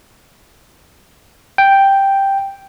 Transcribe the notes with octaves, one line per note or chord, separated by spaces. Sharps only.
G5